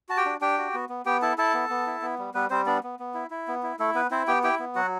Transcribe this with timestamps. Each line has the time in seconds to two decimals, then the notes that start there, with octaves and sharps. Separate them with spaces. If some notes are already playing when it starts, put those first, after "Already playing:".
0.09 F#4 A5
0.17 G4 G5
0.25 D4
0.41 D4 G4 G5
0.58 F#4
0.74 B3
0.89 B3
1.06 B3 G4 G5
1.22 E4 A4 A5
1.38 E4 A4 A5
1.54 B3
1.70 B3
1.87 E4
2.02 B3
2.18 G3
2.34 G3 B3 B4
2.50 G3 C4 C5
2.66 B3 D4 D5
2.83 B3
2.99 B3
3.14 E4
3.30 E4
3.48 B3
3.63 E4
3.79 A3 E4 A4
3.95 B3 B4
4.11 C4 E4 C5
4.27 B3 G4 G5
4.43 E4 G4 G5
4.59 B3
4.75 F#3 F#4 F#5